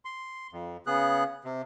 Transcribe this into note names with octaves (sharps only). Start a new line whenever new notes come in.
C6
F2
C#3 B3 G#4 F#6
C3